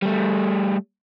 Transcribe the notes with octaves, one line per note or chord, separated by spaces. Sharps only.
G3 A3